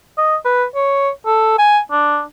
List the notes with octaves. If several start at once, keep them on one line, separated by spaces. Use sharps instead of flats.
D#5
B4
C#5
A4
G#5
D4